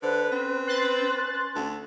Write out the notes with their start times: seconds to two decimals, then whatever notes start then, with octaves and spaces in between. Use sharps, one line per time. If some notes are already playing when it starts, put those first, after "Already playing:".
0.02 D3 B4 C5
0.31 C4 C#4
0.67 B4 C6 F#6 A6
1.00 C#4
1.55 D2